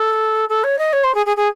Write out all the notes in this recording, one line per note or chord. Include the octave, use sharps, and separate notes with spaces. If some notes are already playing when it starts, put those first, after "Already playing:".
Already playing: A4
A4
C#5
D#5
C#5
C5
G#4
G#4
G#4